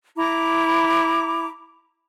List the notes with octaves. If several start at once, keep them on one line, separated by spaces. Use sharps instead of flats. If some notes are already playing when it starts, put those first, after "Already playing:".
E4 A#5 D6